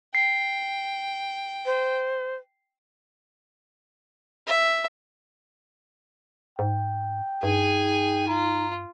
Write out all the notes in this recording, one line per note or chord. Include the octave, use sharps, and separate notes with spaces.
G5 C7
C5
E5
G#2 G5
G2 D#4 G#4 G#5
F4 A#5